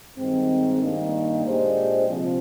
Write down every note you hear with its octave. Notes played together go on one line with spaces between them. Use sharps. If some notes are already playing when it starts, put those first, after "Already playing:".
G2 D#3 G#3 C4
G2 D#3 A#3 D4
A#2 G#3 D4 G4 C5
C3 F3 C4 F4